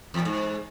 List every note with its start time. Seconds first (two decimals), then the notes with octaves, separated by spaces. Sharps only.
0.14 E2
0.20 A#2
0.25 G#2